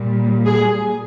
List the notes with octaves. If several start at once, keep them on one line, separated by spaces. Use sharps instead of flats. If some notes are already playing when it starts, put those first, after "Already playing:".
Already playing: A#2 G3
G#4